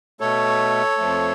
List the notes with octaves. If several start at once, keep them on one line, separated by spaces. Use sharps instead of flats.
B2 A3 A4 C#5
F2 F3 A3